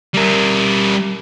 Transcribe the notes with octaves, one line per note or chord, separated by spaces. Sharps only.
G3 A#4